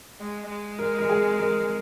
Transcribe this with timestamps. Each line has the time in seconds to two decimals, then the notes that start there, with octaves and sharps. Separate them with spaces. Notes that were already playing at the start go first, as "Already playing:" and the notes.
0.20 G#3
0.50 G#3
0.79 A#4
0.99 A#4
1.09 G#4
1.39 A#4